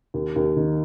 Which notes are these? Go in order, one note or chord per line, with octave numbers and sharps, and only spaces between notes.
D#2
D#2
D#3